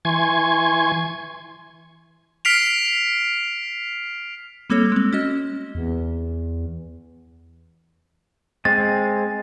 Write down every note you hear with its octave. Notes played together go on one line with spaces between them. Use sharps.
E3 G#5 C6 C#6 G#6
F6 B6 C7 D7 F7
G3 A#3 C4 A4 C#5
G#3 C4
C#4 F#4 D#5
E2
G#3 C4 A6